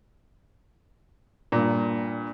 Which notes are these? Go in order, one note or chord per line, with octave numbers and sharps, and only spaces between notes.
G2 A#2